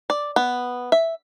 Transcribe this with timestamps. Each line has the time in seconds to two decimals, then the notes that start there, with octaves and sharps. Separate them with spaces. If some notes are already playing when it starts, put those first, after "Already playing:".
0.10 D5
0.36 B3
0.92 E5